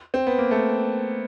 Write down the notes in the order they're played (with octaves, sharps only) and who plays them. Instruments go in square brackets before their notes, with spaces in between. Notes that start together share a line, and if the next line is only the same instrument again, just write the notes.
[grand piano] C4
B3
A#3
A3